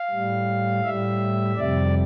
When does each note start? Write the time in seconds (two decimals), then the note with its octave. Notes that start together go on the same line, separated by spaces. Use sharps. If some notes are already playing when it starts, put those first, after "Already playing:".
Already playing: F5
0.11 A2 G3
0.84 A2 G3 E5
1.56 F2 C3 G3 D5